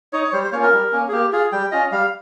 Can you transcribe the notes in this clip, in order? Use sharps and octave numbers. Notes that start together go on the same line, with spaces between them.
D#4 C#5
C#5
G3 C5
C5
A#3 C#4 F4 C#5
A#4
G3
A#3 C#4
G#4
A#3 G4
F4 G#4
G3 G5
C#4 F4 D#5
G3 F5